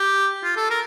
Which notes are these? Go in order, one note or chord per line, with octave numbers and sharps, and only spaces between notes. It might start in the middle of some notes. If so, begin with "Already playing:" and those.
Already playing: G4
F4
A4
A#4